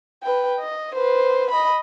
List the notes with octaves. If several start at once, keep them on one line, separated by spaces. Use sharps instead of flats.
B4 G5
D#5
B4 C5
D#5 B5